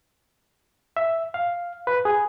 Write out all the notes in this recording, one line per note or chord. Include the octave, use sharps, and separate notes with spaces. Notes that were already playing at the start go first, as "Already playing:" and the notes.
E5
F5
B4
G#4